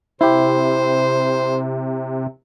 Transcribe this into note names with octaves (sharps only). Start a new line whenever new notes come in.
C3 E4 G4 C5